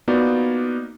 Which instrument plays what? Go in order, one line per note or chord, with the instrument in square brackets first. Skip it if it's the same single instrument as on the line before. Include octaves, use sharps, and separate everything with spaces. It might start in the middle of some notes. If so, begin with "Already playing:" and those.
[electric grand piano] A#3 B3 D#4 F4 F#4 D5